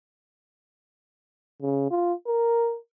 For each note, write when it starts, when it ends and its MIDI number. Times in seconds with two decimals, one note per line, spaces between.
1.62 1.87 49
1.91 2.13 65
2.27 2.77 70